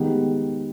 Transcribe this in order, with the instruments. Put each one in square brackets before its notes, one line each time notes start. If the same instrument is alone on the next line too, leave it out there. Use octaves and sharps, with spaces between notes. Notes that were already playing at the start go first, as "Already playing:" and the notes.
Already playing: [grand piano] D#3 G#3 B3 D#4 G4